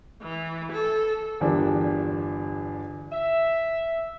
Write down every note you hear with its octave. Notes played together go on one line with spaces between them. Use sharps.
E3
A4
G1 E2 G3 D4 A#4
E5